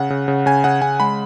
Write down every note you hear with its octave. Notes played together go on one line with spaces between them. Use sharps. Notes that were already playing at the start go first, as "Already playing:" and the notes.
Already playing: C#3 F#5
C#3
C#3
C#3 G#5
C#3 F#5
C#3 G#5
G#3 B5